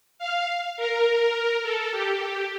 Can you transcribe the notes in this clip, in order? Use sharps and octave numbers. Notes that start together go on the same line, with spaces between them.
F5
A#4
A4
G4